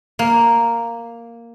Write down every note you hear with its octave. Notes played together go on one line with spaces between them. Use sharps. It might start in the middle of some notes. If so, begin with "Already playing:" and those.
A#3